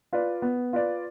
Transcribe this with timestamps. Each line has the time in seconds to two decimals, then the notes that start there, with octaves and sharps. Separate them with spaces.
0.13 F4 B4 D5
0.42 B3
0.73 F4 B4 D5